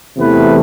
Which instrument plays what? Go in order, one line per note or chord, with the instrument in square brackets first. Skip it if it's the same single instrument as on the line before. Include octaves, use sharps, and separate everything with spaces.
[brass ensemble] E2 C3 E3 A3 B3 B4